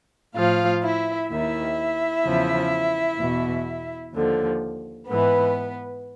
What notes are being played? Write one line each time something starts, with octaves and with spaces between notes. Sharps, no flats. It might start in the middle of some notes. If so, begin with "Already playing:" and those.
A2 F3 F4 F5
E4 E5
D#2 D#3 E4 E5
E2 C#3 F3
E2 B2
D#2 D3 F3
G#2 E3 B3 B4